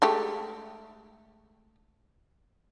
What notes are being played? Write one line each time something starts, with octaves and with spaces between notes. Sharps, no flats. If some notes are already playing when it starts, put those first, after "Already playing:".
G#3 A3 G4